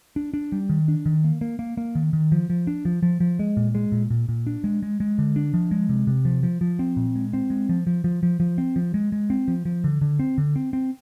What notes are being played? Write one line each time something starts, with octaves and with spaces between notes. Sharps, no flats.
D4
D4
G3
D#3
D4
D#3
A#3
A#3
A#3
A#3
D#3
D#3
F3
F3
D4
F3
F3
F3
G#3
A#2
G#3
A#2
A#2
A#2
D4
G#3
G#3
G#3
D3
D4
F3
G#3
C3
C3
F3
F3
F3
C4
A#2
G#3
C4
G#3
F3
F3
F3
F3
F3
C4
F3
G#3
G#3
C4
F3
F3
D3
D3
C4
D3
C4
C4